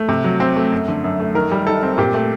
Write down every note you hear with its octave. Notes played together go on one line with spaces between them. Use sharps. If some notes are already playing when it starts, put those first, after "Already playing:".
Already playing: A3
C3
F#3
C4
A3
F#2
D3
F#2
A3
D#3 A#4
G3
D#4 A4
C4
A#2 G4
A3